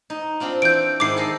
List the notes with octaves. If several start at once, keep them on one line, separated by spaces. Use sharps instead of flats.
D#4
C4 D4 F4
E3 G6 D7
G#2 D#3 E4 D6 C7
G#4 A4 D#5